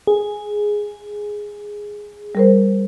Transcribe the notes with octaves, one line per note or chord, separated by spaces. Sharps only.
G#4
G3 A#4 C5